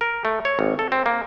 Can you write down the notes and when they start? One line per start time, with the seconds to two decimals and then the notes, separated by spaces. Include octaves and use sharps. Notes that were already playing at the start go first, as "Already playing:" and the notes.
0.01 A#4
0.25 A3
0.45 C#5
0.59 G#1
0.79 A4
0.92 C4
1.06 A#3